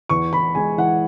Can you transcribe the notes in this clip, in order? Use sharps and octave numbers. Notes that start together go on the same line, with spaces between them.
E2 C#6
E2 B5
G#3 G#5
E3 F#5